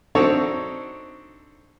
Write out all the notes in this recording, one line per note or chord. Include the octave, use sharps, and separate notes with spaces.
C4 D4 D#4 F#4 A4 C#5